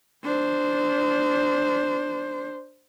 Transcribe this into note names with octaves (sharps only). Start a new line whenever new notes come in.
D4 C5